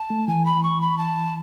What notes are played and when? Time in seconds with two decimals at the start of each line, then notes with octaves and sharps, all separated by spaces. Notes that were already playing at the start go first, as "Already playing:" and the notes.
Already playing: A5
0.10 A3
0.28 E3 G#5
0.45 B5
0.63 C#6
0.81 B5
0.98 A5